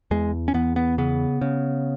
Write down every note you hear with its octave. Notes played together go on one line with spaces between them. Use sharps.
E2 G#3
C#4
E2 B3
B3
C#3 B3
C#3